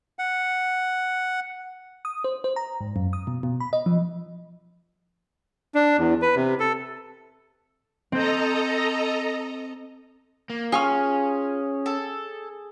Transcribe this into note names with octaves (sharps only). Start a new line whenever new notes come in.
F#5
D#6
C5
C5
A#5
G#2
F#2
D#6
B2
B2
B5
D#5
F3
D4
E2
B4
C3
A4
C4 A4 D#5 A#5 G6
A#3
C#4 F4 G#4 C#6 F6
A4